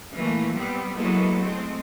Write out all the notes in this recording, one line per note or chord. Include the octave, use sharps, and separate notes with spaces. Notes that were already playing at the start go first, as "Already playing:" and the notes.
A#2 E3 A3 A#3
G3 B3 C4
F#3 G#3 A#3 B3 E4 A4
G#3 A3 C4